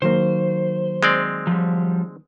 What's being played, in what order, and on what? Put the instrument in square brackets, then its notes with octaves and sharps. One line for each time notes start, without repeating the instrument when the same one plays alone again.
[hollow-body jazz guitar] D#3 F#3 A#3 [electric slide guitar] C5
[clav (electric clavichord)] G#3 C4 D5
[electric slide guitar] F3 G3